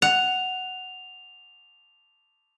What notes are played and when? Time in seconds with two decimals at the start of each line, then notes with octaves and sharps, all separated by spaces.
0.02 F#5 F7